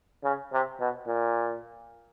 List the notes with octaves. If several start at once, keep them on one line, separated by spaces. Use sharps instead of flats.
C#3
C3
B2
A#2